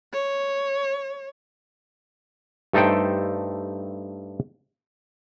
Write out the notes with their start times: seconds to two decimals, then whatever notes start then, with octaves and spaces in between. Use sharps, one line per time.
0.13 C#5
2.73 G2 A3 D#4 A4 C5 G5